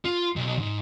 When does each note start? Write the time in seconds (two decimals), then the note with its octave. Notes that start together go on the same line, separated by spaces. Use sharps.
0.05 F4
0.36 B1
0.59 G#2